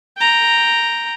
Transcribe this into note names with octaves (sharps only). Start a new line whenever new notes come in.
G5 A#5